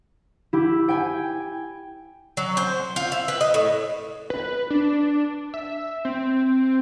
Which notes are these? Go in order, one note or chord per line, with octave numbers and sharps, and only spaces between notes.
E4 G4
G5 G#5
F#3
C5
F4
E4
B4
D#5
A2
B4
D4
E5
C4